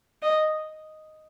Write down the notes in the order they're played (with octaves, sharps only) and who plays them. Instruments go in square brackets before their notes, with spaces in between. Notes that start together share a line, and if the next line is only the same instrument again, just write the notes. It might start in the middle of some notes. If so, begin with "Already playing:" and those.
[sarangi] D#5